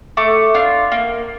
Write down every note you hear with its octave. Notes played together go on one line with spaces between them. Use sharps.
A3 D6
D4 F4
A#3